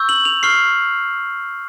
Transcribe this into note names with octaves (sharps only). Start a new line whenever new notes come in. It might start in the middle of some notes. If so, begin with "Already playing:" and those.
Already playing: C#6 E6 G6
F#7
F7
C#6 F6 C7